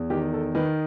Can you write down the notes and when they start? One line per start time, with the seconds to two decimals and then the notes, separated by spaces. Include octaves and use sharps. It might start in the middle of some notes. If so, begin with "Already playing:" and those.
Already playing: E2
0.10 D#3 G4
0.33 A4
0.55 D#3 B4